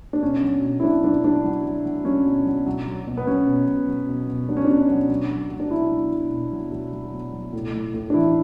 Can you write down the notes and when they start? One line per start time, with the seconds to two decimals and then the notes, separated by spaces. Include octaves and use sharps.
0.13 D4
0.22 B2 C#4
0.43 F#3
0.63 B2
0.80 E4
0.84 F#3 D4
1.04 F#3 D4
1.24 F#3 D4
1.45 F#3
1.65 F#3
1.85 F#3
2.05 F#3 C#4
2.26 B2
2.46 F#3
2.66 F#3
2.87 F#3
3.07 B2
3.17 B3
3.27 F#3 C#4
3.47 B2
3.68 F#3
3.88 F#3
4.08 B2
4.29 B2
4.49 F#3 D4
4.57 C#4
4.65 B2 D4
4.89 F#3
5.10 F#3
5.30 F#3
5.51 F#3
5.60 D4
5.71 B2 E4
5.91 F#3
6.11 B2
6.31 B2
6.52 F#3
6.72 F#3
6.93 F#3
7.13 B2
7.33 F#3
7.53 A2
7.73 A2
7.94 A2
8.10 D4
8.14 E3 E4